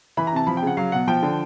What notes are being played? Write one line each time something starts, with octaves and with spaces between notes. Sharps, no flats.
E3 B5
A#5
C3 A5
F3 B5
G5
C#3 F#5
F#3 F5
B2 F#5
F3 G5
D3